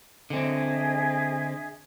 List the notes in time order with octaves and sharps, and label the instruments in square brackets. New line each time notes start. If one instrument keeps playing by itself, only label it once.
[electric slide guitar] D3 C4 [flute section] G#4 D#5 E5